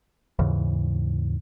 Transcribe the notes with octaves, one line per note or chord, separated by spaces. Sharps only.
D#2 G#2 C#3 E3